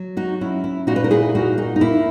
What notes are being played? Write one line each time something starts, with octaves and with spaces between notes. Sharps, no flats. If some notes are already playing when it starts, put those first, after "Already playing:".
Already playing: F#3
D#4 F#4
C#4 E4
E4
A#2 D#4 F#4
B4
A#4
E4 G#4
A#3 D#4 F#4
D#4
D#4
A#3 E4